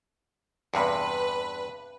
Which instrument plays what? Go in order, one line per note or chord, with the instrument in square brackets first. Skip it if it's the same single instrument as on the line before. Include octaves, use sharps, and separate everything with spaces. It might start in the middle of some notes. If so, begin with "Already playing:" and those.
[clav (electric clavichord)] E2 G2 C3 [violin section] B4